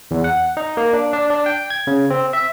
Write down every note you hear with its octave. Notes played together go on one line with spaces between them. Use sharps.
E2
F#5
D#4
A#3
D4
D4
D4
G5
G#6
C#3
C4
E5